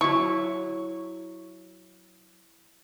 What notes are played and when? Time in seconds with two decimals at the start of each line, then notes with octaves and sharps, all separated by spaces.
0.01 F#3 E4 C#6